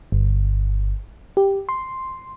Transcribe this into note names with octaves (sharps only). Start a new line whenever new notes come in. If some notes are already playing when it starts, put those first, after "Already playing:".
G1
G4
C6